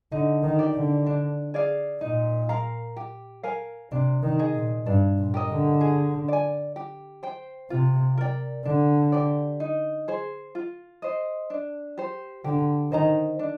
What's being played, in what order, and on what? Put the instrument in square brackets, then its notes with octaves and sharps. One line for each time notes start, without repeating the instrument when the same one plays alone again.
[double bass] D3 [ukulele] D#4
[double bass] D#3
[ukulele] G4 D5
[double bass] D3
[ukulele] D4
G#4 D5 F5
[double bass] A#2 [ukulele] D#4
[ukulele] A#4 F5 A#5
G4
A#4 F5 G#5
[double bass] C3 [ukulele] D4
[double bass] D#3
[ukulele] G#4 D#5
[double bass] A#2
[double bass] G2 [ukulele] D4
[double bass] A#2
[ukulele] G4 A#4 D#5
[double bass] D3
[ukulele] G#4
D5 G#5
G4
C5 G5
[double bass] C3 [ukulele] F4
[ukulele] A#4 D5 G5
[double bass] D3 [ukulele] D4
[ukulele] G4 D5
D#4
G#4 C5
F4
C5 D#5
D4
G4 C5
[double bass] D3 [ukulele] G4
[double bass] D#3 [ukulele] C5 D#5 A#5
[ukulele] D4